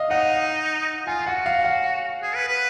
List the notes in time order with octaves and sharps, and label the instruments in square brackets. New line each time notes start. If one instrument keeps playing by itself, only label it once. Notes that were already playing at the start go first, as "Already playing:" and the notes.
Already playing: [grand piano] D#5 F5
[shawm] D#4 [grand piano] F#5
[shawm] F4 [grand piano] G#5
[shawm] F#4 [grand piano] F#5
[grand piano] F5
F#5
[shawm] G#4
B4
B4